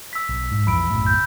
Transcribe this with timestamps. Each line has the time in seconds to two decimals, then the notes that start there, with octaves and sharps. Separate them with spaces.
0.13 E6 B6
0.29 B1
0.52 G#2
0.67 B1 F2 E3 B5 E6 D7
0.90 F#1 B1 A2
1.06 G6